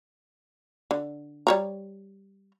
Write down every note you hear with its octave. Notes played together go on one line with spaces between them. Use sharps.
D3
G3 C#5 A#5